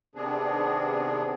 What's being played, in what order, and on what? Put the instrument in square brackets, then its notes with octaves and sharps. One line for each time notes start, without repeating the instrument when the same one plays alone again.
[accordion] C3 D#3 B3 C4 D4 G#4